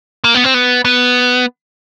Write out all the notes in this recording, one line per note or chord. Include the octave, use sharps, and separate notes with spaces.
A#3
B3
C4
B3
B3